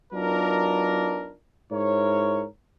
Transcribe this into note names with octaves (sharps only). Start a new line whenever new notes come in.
F#3 B3 D4 D#4 F4 A#4
G#2 E4 A#4 C#5